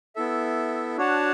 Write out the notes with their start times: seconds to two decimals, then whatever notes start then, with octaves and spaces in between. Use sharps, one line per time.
0.16 B3 E4 A4 E5
0.97 D4 F#4 C#5 F#5 A5